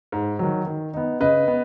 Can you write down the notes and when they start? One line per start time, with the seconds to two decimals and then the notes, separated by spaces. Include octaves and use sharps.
0.12 G#2
0.39 D#3 F#3
0.66 D#3
0.94 B3 D#4
1.20 C#3 B4 D#5
1.48 B3